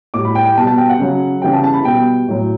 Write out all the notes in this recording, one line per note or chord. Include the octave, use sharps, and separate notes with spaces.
A2 G3 D6
B5
G5
G5
B2 G3 A5
A5
G5
F#5
C#3 F#3
C#3 E3 G3 G5
A5
A5
B5
B2 G3 G5
A2 F#3